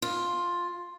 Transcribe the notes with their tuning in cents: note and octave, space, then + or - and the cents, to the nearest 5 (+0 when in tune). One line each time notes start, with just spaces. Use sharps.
F4 +5